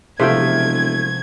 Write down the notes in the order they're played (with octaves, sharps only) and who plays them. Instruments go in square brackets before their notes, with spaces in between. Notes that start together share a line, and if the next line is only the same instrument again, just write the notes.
[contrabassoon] E1 [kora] C3 F3 G5 [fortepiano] A3 F4 E5 [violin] G#6